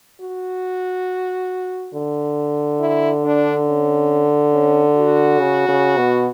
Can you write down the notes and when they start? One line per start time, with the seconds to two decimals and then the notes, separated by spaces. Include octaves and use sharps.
0.21 F#4
1.94 D3
2.80 E4
3.24 D4
3.67 C#4
4.53 C#4
4.97 F#4
5.40 C#3
5.69 C#3
5.97 B2